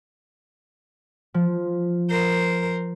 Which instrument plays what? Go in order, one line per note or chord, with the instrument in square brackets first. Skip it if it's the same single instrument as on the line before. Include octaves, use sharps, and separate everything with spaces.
[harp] F3
[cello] A#4 C5